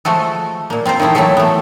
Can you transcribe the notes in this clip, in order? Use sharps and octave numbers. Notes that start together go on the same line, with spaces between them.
F3 G#3 A3 F#4 A4
A#2 A#3
C4 F4 A#4 C5
D#3 E3 A3 D#4 E4
E3 F#3 A3 A#3 G4 A4
A3 B3